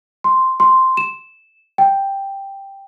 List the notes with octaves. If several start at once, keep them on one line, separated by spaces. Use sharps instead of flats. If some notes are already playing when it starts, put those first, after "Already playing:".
C6
C6
E7
G5